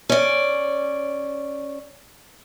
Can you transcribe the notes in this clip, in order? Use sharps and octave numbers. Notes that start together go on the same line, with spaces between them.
C#4 D5